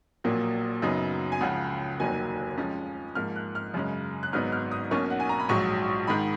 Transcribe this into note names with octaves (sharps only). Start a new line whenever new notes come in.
A#1 A#2 F#3 A#3
F#2 C#3 F#3 B3 D#4
G#5
C#2 C#3 F3 F#5
F1 D#2 D#3 F#3 A#3 G#5
F2 F3 G#3 C#4
G#2 F3 A#3 F6
F#6
F6
F#2 C#3 G#3 C#4
F#6
G#1 G#2 F#3 B3 D#4 F6
F6
D#6
B1 B2 A#3 C#4 C#6
F#5
G#5
A#5
B5
A#1 G#2 F#3 C#6
G#2 D#3 B5